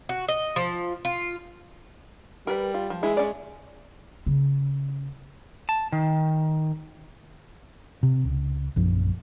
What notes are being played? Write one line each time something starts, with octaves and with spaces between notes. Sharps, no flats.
F#4
D#5
F3
F4
G3 A#4 B4
F4
F3
E3 G#3 E4
C#4 D5
C#3
A5
D#3
C3
C#2
A#1 F#2 F3